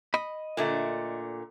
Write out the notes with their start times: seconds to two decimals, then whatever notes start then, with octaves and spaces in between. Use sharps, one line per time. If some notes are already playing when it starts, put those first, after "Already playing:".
0.14 D#5 B5
0.57 A#2 D3 A3